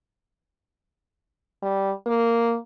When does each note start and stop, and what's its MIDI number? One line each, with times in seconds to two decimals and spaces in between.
1.62 1.91 55
2.06 2.57 58